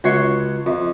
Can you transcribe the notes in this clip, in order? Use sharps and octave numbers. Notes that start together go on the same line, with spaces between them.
C#2 F#4 C#5 C6 C#6
F2